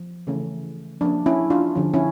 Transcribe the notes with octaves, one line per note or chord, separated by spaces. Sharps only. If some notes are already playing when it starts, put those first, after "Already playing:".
Already playing: F3
C#3 E3 A3 C#4
F3 A#3 C#4 D4
C#4 E4
D4 F4
D3 F3 C#4
C#4 E4